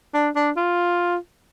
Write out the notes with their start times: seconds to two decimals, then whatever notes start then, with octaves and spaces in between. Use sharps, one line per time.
0.14 D4
0.36 D4
0.57 F4